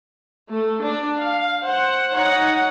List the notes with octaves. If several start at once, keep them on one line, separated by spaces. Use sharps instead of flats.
A3
D4
F5
C5 F#5
D#4 C#5 F#5